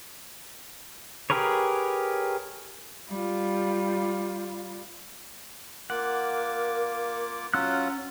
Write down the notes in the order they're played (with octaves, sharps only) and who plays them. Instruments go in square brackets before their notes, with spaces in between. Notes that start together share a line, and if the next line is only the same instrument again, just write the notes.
[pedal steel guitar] G4 G#4 A#4 B4 C#5
[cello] G3 F4
[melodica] A#3 F4 D6 [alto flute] A#4 [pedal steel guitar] F#5
[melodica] F#3 F4 F#5 [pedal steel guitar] C#4 E6 F#6